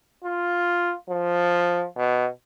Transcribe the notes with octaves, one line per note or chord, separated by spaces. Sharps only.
F4
F3
B2